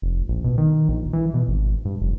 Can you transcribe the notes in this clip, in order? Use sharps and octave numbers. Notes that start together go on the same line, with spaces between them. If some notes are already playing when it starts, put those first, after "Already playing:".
F1
A#1
B2
D#3
A#1
E3
B2
G#1
G2
F1